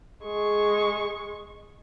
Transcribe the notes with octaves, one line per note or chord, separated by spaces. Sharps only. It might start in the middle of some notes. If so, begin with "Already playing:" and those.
G#3 C#6